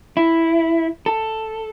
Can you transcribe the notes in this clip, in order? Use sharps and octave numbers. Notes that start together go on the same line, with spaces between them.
E4
A4